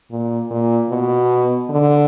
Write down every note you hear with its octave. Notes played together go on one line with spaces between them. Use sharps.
A#2
A#2
B2
D3